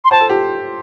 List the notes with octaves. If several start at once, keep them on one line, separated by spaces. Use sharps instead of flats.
C6
C5 A5
A4
G4